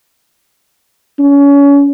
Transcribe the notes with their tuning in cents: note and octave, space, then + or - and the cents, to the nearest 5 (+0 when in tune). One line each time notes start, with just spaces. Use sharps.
C#4 +30